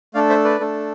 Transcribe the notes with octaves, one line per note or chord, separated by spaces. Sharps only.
A3 D4 A4 D5 F5
C5 E5
B4 D5
A3 D4 A4